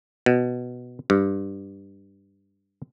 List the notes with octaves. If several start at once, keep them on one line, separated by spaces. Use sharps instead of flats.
B2
G2